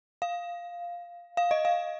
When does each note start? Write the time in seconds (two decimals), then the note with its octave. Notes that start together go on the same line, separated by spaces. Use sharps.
0.22 F5
1.37 F5
1.51 D#5
1.65 F5